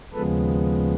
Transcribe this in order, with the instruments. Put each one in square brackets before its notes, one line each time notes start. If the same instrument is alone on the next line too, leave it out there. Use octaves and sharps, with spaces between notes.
[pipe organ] D#2 C#3 F3 G#3 B3 A4 B4